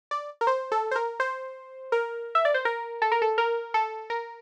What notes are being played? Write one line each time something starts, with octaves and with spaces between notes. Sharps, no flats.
D5
A#4
C5
A4
C5
A#4
C5
A#4
E5
D5
C5
A#4
A4
A#4
A4
A#4
A4
A#4